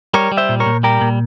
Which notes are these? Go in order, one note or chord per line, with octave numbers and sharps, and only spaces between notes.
G3 A#4 C#5
G3
C5 E5
A#2
A#4 C#5
A#2
G3 G4 A#4
A#2